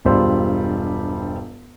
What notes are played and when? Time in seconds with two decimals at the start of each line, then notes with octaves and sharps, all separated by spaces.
0.05 E1 G2 G3 F4 C5 E6